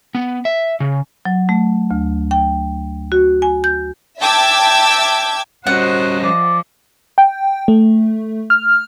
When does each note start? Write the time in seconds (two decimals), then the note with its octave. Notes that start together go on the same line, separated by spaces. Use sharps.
0.15 B3
0.45 E5
0.80 C#3
1.25 F#3
1.49 A3
1.91 D2
2.31 G5
3.12 F#4
3.42 G#5
3.64 G6
4.20 E5 G5 A5 D6 E6 G#6
5.67 G3 C#4 F#4 C5 D#5 F#5
6.24 F3 D5
7.18 G5
7.68 A3
8.50 F6